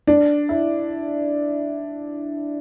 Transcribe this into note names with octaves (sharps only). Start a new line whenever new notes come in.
D4
E4